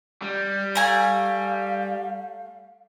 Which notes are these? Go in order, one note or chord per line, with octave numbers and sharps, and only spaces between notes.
G3
A3 F5 G#5 A#5